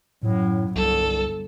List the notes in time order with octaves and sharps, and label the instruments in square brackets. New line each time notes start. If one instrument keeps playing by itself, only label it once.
[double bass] F#2 F#3 [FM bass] A2
[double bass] G1 [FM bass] C2 [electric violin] A4